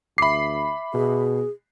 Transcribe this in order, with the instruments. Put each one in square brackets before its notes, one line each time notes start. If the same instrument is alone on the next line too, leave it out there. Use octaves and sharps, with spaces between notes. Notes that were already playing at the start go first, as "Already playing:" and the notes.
[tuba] D2 [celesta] E5 D6 [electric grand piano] B5 C7
[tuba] B2 [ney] G#4